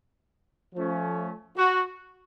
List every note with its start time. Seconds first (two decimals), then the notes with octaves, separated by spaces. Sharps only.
0.74 F3 A3 C#4
1.57 F#4